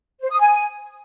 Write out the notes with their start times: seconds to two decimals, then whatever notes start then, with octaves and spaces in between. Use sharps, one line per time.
0.21 C5
0.31 D#6
0.40 G#5